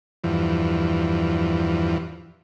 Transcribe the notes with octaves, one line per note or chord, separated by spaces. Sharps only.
E2 G2 E3 F3